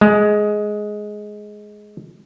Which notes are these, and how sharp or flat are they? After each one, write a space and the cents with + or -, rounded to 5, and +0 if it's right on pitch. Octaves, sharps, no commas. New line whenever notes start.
G#3 +10